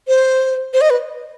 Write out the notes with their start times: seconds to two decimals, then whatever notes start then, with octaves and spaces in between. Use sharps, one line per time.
0.08 C5
0.73 C5
0.81 D#5
0.90 B4